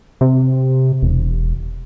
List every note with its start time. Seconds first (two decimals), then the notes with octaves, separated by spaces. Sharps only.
0.21 C3
1.02 E1